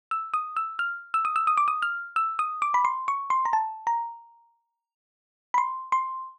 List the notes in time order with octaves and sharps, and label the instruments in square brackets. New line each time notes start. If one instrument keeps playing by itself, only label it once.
[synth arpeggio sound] E6
D#6
E6
F6
E6
D#6
E6
D#6
D6
D#6
F6
E6
D#6
D6
B5
C6
C#6
C6
A#5
A5
A#5
B5
C6
C6